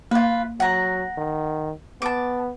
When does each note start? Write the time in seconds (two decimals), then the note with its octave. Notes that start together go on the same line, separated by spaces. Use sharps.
0.11 A#3 F4 B4
0.60 F#3 F#5 A#5
1.18 D#3
2.02 B3 A5 D6